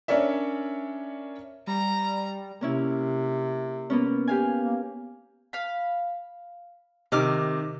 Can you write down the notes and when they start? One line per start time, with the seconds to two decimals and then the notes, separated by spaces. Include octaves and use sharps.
0.08 C#4 D4 A#4 C#5 D5 E5
1.67 G3 A#5
2.61 C3 A#3 C#4 E4
3.90 A#3 B3 C#4
4.28 G4 F5 G#5
4.64 A#3
5.53 F5 B5
7.12 C3 D#3 D#5 D6 F6